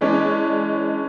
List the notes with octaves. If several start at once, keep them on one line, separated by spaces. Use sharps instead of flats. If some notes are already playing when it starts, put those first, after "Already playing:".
E3 G#3 C#4 D4